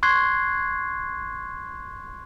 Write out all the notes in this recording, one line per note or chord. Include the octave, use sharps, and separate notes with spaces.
C6 C#6 F#6 G#6 C7